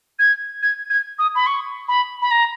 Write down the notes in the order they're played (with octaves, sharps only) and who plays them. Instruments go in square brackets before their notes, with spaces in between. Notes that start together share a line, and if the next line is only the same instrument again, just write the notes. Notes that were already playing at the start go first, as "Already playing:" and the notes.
[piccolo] G#6
G#6
G#6
D#6
B5
C#6
B5
B5
A#5